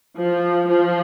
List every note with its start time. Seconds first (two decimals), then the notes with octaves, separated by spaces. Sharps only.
0.17 F3
0.70 F3